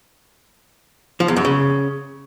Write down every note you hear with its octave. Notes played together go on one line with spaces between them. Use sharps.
F3
E2
F#2
C#3